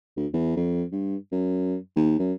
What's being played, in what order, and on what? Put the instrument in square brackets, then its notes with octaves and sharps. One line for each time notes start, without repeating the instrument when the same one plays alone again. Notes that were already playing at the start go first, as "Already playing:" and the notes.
[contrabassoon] D2
E2
F2
G2
F#2
D#2
F#2